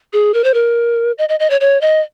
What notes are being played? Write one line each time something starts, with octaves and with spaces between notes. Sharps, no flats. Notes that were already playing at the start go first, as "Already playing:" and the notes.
G#4
A#4
C5
A#4
D#5
D#5
D#5
C#5
C#5
D#5